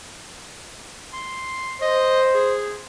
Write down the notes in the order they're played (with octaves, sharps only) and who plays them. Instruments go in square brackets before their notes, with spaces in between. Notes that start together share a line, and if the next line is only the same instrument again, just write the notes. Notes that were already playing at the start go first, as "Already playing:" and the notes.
[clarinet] C6
[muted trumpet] C5 [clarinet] D#5
[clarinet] G#4